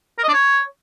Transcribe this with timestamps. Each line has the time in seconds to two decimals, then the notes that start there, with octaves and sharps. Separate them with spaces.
0.18 A#4
0.23 D#5
0.28 D4
0.33 C#5